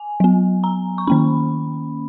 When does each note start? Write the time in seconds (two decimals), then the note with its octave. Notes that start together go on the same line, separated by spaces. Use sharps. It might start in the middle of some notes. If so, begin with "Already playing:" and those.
Already playing: G#5
0.20 F#3 B3
0.64 A#5
0.98 C#6
1.07 D#3 A#3 C#4 B5